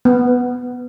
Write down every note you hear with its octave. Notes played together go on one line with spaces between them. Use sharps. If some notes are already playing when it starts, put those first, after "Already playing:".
B3